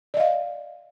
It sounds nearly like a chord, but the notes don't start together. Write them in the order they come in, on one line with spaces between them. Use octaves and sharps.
D5 D#5 F5